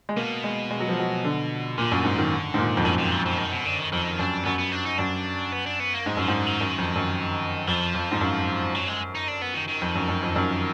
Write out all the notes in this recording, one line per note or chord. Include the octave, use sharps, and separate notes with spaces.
G#3
B2 A#3
G#3
G#3
F#3
F3
F#3
D3
A#2 D3
F#2
G#2
D#3
G#2
A#2
F2
F#2 D#3
D#3
F3
F3
D#3
B2
D3
D#3
F2 D#3
F#2 D4
F#2 B3
B3
D4
D#4
F#2 D4
B3
D4
B3
A#3
G#2 G#3
F#2 F3
G#2
D3
D#3
F#2
F2
F#2
F2 F3
F2
G#2
F#2
F#3
G#3
D#4
D4
B3
D#3
D#3
F2
F#2
F#2
F2
F#2